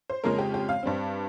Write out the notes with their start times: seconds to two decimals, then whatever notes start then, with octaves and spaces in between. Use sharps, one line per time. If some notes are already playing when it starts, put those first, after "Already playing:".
0.10 C5
0.24 F2 C#3 G#3 C#4 A#4
0.38 G4
0.54 G4
0.69 F5
0.83 G2 G3 C4